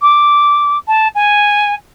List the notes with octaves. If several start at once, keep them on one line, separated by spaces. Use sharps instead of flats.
D6
A5
G#5